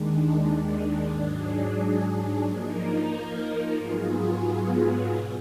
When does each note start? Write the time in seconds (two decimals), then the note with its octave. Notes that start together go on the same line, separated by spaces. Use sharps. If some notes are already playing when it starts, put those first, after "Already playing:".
Already playing: D#2 D#3 G#3 D4
1.11 G#2 F#3 D4 G#4
2.44 F3 A#3 D#4 A#4
3.77 G#2 F#3 B3 F4 G#4
5.10 B2